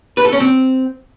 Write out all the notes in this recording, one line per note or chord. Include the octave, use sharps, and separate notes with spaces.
B4
A4
C#4
C4